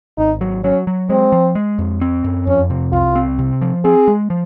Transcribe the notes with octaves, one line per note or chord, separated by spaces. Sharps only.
G#1 D#4
F#3
F#3 C#4
F#3
G#3 C4
F3
G#3
F2
C4
F#2
F2 C#4
C3
C2 F4
C4
C3
F3
C4 G#4
G#3
F3